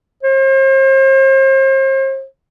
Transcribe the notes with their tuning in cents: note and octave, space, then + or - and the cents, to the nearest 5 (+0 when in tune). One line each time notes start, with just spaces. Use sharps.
C5 +40